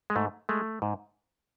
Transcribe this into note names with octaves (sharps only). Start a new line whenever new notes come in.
G#3
G#2 A3
G#3 A3
G#2